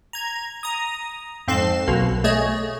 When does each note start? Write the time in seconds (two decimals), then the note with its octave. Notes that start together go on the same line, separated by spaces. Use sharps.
0.13 A#5 G#6
0.63 A#5 D#6
1.48 F2 G#2 C4 A4 C7 E7
1.88 B1 B2 A#3
2.24 A3 G#4 C#5 D#5